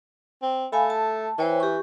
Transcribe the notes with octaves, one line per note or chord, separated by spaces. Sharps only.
C4
A3 F5 G#5 B5
A5
E3 C5 C#5 G5
G4 C#6